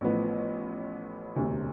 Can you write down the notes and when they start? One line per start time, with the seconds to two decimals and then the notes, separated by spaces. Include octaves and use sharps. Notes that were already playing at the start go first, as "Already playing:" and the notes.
0.01 A1 A2 F3 B3
1.36 E1 D2 C3